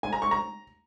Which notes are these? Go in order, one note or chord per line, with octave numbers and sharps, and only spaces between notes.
G#5
A#5
C#6
A#5